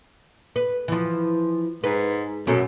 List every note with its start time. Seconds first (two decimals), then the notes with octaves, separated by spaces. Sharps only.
0.56 B4
0.88 E3 F3
1.84 G#2 B4
2.47 F#2 B2 A3 C#4